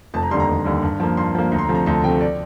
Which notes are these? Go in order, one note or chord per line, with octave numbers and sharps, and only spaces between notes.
F1 A5
A#5
D#2 D3 G3 C6
A#5
F1
D#2 D3 G3
G2
F3 A#3
G2 C6
F3 A#3
D2 A#5
C6
A#5
C3 F3 A3
A#5
D2 A5
C3 F3 A3 G5
D5